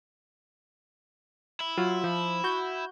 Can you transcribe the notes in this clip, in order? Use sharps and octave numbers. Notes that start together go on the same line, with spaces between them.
E4
F#3 F4
F3
F#4 G6